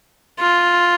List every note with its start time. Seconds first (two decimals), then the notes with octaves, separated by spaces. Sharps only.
0.40 F4